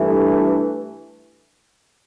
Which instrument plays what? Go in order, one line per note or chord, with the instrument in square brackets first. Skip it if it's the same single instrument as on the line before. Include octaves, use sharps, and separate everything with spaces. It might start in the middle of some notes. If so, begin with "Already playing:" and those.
Already playing: [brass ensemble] G2 E3 A3